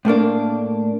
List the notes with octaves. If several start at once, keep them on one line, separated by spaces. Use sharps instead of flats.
A2 A3 A#3 D4